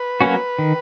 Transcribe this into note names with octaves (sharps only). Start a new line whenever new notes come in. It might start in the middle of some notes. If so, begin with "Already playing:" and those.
Already playing: B4
F#3 A#3 C#4 F#4
D#3